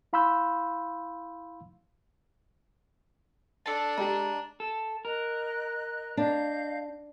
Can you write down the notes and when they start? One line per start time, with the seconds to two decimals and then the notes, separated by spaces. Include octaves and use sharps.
0.13 E4 F5 B5 C6 E6 G6
3.66 D4 A4 A5
3.98 G#3 G4 A#5
4.60 A4
5.05 A#4 D#5 F#6
6.17 D4 D#5 F5 G6